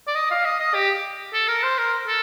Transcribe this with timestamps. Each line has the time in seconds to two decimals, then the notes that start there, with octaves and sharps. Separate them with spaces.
0.07 D5
0.15 D#5
0.31 F5
0.45 D#5
0.60 D#5
0.74 G4
1.33 A4
1.48 A#4
1.63 C5
1.78 A#4
2.07 A4